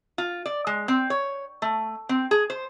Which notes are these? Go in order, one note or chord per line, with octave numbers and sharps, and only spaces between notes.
F4
D5
G#3
C4
C#5
A3
C4
G#4
C5